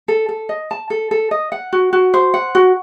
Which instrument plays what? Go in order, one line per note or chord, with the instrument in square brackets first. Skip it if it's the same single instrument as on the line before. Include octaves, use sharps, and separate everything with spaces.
[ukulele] A4
A4
D#5
A5
A4
A4
D#5
F#5
F#4
F#4
C5
F#5
F#4